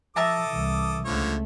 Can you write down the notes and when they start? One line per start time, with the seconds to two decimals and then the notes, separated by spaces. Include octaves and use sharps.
0.16 F3 A4 E5 A5 A#5 D6 D#6
0.49 C2 E3
1.05 C#2 D3 F3 A3 C#5